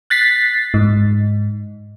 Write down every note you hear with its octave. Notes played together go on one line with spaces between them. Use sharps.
F#6 A6 B6 C7
G#2